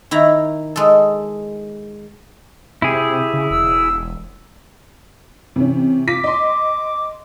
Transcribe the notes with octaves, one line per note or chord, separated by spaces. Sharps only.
D#3 E4 A#5
G#3 A4
C3 E4 G4 G#4
C#3
E1 E6
C3 E3 C#4
F4 D6 B6
D#5 C6